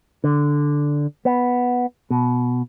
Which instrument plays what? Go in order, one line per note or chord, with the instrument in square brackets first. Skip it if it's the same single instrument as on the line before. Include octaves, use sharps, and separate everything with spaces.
[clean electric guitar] D3
B3
B2